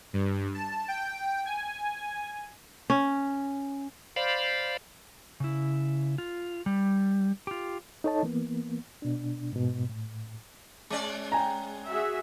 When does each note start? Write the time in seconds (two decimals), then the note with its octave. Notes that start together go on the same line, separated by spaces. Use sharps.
0.13 G2
0.54 A5
0.88 G5
1.46 G#5
2.90 C#4
4.16 C5 D5 F5 B5
5.40 C#3 E4
6.18 F4
6.66 G3
7.47 F4 G4
8.04 D#4 A4 C#5 D#5 A5
8.23 E3 A#3 B3
9.02 B2 D4
9.53 G#2 B2
9.89 A2
10.90 G#3 C#4 D5
11.32 G5 G#5 A#5
11.90 F#4 G#4 E5